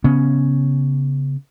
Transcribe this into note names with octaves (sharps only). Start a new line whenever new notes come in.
C#3 B3 C#4